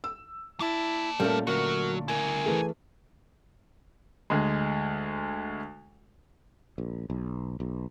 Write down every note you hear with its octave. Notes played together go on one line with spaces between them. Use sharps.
E6
A#3 E4 A5
A#2 G3 A3 C#4 A4 A#4
D2 F#3 F#4 A#4
E4 A#4 G#5
E3 A3 G#4
D2 G#3
A#1
B1
B1